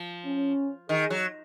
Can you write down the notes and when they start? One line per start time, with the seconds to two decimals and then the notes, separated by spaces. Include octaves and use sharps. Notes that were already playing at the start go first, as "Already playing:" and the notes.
Already playing: F3
0.25 C#4
0.89 D#3 G#4
1.10 F#3